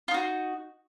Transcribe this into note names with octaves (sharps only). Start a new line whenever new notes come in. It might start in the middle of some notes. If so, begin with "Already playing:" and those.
D#4 F4 F#4